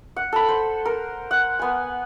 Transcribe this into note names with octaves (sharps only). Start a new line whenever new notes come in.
F#5
A4 B5
C5
A#4
F#5
B3 G#5